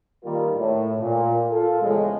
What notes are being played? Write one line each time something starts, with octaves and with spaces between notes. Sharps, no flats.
D#3 G3 A#3 F4 A#4
A2
A#2
F4 A4
E2 A2 C#3 F3 G#3